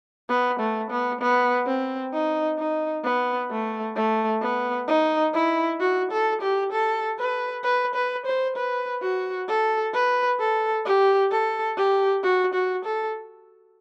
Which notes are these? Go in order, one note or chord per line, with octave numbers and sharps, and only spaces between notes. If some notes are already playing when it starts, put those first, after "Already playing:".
B3
A3
B3
B3
C4
D#4
D#4
B3
A3
A3
B3
D#4
E4
F#4
A4
G4
A4
B4
B4
B4
C5
B4
F#4
A4
B4
A4
G4
A4
G4
F#4
F#4
A4